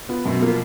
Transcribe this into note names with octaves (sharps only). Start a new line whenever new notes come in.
B3 F4
F#2 B2
F3 A#3 F4 A#4